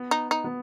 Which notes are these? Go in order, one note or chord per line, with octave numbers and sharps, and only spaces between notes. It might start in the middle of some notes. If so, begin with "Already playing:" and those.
Already playing: B3
D#4
D#4
B3